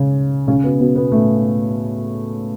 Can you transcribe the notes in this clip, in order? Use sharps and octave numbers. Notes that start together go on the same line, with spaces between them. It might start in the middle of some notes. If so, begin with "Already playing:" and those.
Already playing: C#3 C#4
C#3 C#4
B2 B3
B2 B3
B2 B3
A2 A3